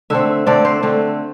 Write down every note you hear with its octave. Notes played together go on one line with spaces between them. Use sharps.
D3 A3 C4 E5
D3 A3 C4 D5
C5
D3 A3 C4